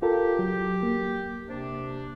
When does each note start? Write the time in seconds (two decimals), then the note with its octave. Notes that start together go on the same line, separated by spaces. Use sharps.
0.02 F4 G4 A4 A#4
0.39 F#3
0.83 A#3
1.49 C3 D4